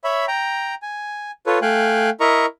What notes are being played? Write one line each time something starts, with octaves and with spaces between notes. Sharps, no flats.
C#5 E5 B5
G5 A#5
G#5
F4 A4 B4 C#5
A3 F5 G5 G#5 F#6
E4 A#4 D#5 A#5 C#6